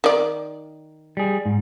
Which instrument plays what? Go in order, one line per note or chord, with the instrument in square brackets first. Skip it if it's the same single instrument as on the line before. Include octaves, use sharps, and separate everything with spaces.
[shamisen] D#3 D5
[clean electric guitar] G3 G#4
G#2